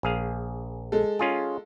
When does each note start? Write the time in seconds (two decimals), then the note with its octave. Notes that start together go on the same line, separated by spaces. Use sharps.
0.03 A#1 G#4 F5
0.92 G#3 A4
1.19 C#4 F4 G#4